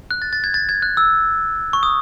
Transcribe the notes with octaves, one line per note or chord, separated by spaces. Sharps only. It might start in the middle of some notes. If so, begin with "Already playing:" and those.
F#6
A6
A6
G#6
A6
G#6
F#6
E6
C#6
D#6